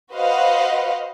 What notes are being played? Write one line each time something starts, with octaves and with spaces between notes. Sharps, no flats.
F#4 B4 C5 D#5 F5 F#5